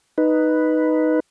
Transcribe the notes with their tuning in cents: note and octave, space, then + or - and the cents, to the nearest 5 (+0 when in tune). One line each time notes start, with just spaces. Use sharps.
D#4 +0 B4 +0